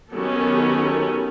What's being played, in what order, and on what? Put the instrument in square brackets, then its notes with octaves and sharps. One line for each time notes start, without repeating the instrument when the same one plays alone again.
[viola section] D#3 F#3 B3 C#4 G4 A4